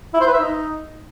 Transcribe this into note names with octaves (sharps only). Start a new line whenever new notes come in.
E4
C5
B4
E5
D#4